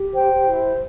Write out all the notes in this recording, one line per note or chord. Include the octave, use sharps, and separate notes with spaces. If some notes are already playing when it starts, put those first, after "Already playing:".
Already playing: G4
C5 G5
E4